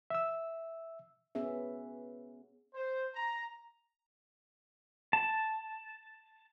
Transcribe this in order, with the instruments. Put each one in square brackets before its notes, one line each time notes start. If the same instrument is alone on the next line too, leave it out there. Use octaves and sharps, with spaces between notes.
[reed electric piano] E5 E6
[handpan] B3 C#4 G#4 E5
[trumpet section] C5
A#5
[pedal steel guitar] A5